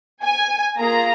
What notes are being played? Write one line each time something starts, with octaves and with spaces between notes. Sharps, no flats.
G#5
A#3 F4 G#4 A#5